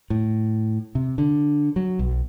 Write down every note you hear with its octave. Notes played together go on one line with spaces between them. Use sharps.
A2
C3
D3
F#3
B1